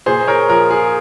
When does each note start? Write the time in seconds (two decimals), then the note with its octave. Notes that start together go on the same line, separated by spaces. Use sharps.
0.06 A#2 G#4 C5
0.27 A#4 C#5
0.49 F3 A#4
0.71 G#4